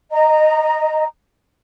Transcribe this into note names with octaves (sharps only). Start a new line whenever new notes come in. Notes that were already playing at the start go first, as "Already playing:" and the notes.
D#5 A#5